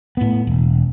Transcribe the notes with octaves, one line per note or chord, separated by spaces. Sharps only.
A2 B3
E1